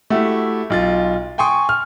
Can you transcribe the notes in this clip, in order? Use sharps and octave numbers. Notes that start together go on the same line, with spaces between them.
A3 E4 F#4 G4
B1 F4 A6
G5 G#5 C6 C#6 D#6
F6